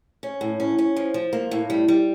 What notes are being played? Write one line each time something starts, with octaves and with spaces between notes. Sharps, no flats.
C#4
A2
C#4
C#4
F3
F3
A#3
A2
G3
G3